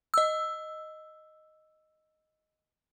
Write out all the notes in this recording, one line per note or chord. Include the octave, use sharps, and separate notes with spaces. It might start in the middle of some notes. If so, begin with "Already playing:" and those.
D#5 E6